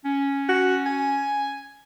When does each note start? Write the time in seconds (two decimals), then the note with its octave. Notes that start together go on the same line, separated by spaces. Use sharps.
0.05 C#4
0.49 F#4
0.86 G#5